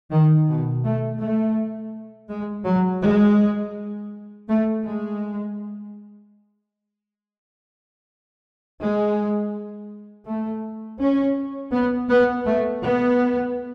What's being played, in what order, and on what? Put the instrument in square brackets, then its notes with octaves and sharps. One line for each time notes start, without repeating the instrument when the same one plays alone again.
[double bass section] D#3
B2
A3
A3
G#3
F#3
G#3
A3
G#3
G#3
A3
C#4
B3
B3
A3
B3